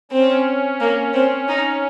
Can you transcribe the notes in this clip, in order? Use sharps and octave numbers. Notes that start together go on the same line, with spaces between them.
C4 C#4
A#3
C4
D#4